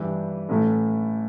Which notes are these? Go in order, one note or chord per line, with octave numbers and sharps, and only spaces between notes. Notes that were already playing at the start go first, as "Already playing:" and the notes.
Already playing: G2 E3 G3 D4
A1 A2 E3